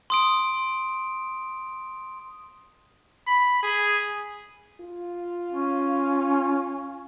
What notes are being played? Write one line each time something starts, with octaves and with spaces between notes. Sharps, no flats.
C6 D#6 D7
B5
G#4
F4
C#4